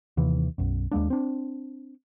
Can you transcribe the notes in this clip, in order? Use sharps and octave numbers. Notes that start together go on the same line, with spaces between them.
D#2 C3 E3
B1 F#2
D#2 G#3 A#3 D4
C4 D4